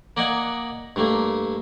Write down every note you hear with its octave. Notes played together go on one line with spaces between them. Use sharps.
A#3 D5 D#5 F#5 G#5
G2 A3 A#3